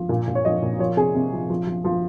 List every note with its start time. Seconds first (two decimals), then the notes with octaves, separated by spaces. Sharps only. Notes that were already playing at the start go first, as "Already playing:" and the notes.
Already playing: F3
0.09 A#2
0.27 A#2
0.35 C#5
0.45 F3 D#5
0.62 A#2
0.79 F3 C#5
0.97 C3 G#4
1.15 C3
1.33 F3
1.49 F3
1.67 F3
1.84 F3